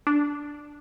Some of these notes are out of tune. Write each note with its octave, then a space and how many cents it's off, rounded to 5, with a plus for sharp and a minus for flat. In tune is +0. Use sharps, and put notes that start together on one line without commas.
D4 +0